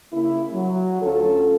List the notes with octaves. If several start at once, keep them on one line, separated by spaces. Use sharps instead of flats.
C#3 A#3 E4
F#3
D2 C#4 F4 A4